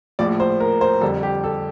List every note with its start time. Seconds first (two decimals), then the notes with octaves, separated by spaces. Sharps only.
0.19 A#1 A2 F3 D5
0.40 C5
0.60 A#4
0.81 C5
1.01 F2 D3 G3 A4
1.23 G4
1.44 A4